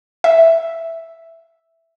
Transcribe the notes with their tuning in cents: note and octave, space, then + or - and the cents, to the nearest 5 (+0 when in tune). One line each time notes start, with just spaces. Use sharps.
E5 +0